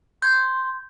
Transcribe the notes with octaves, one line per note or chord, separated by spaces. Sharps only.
C6 G6 G#6